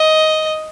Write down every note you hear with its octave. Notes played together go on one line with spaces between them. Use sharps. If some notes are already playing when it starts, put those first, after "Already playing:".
Already playing: D#5